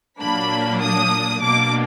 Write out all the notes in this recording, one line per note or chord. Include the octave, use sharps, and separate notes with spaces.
A#2 F#3 A#3 D4 B5
D#6
B2 A#3 D4 D6